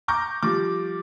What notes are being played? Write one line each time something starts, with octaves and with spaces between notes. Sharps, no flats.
A#5 C#6 D6 G6 A#6
F3 G3 D6